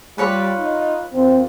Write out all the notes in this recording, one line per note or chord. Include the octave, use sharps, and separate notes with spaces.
G3 F4 B4 C#5 B5
D#4
D#2 C4 F4